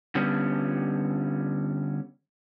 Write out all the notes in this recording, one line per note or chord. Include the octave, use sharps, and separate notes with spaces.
D3 G3 B3 C#4